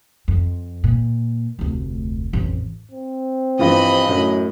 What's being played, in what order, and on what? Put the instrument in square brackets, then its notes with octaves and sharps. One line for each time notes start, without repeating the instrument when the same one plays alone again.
[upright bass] F2
A#2
F1 D2
A1 F2
[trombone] C4
[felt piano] G2 E3 F3 [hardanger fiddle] D#5 B5
[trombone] F#2 [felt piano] A2